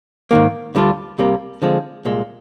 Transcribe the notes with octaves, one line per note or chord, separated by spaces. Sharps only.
G#2 D#3 A#3
D2 D3 G3 D4 F4
C2 C3 G3 A#3
D3 F3 G#3 C4
C2 A#2 G#3